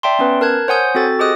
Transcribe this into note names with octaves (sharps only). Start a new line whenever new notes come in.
D5 E5 G5 A5 C6
B3 C#4 B4
A#4 A5 F#6 G#6
C5 C#5 F#5 G#5 D#6 G6
C4 F#4 A4 A6
G4 G#4 C5 D#5 D#6 F#6